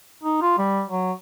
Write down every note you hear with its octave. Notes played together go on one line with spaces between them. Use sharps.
D#4
F4
G3
F#3